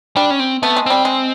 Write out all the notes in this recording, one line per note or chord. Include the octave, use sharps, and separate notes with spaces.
G3 D4
C#4
C4
A3 B3
G#3
G3 C4
G#3